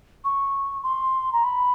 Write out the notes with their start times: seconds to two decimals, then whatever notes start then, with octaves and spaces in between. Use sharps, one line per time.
0.24 C#6
0.83 C6
1.33 A#5
1.44 B5